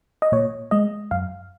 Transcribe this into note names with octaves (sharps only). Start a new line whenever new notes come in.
D#5
A#2 C#5
G#3 D#5
F#2 F5